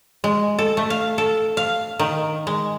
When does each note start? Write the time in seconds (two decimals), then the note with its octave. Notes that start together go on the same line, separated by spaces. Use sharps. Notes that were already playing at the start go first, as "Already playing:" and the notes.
0.24 G#3
0.59 A4
0.77 A3
0.90 F5
1.18 A4
1.57 F5
1.99 D#3
2.47 G#3